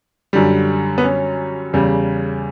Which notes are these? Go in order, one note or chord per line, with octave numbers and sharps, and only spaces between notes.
F#2 D3 G3
B3
C#4
E2 C#3 G3